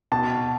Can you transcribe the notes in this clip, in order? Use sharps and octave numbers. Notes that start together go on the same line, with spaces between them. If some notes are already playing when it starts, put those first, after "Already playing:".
B2 A5